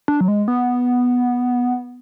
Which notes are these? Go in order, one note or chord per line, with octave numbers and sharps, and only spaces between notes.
D4
F#3
G#3
B3